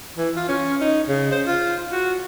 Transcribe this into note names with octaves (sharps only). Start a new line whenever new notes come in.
E3
F4
C#4
D#4
C#3
C5
F4
F#4